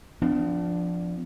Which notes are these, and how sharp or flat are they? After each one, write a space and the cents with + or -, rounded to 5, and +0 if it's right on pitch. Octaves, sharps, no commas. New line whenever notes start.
F3 +0 B3 +40 D4 +0